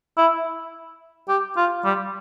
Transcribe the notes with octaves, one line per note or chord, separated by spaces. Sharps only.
E4
G4
F4
G3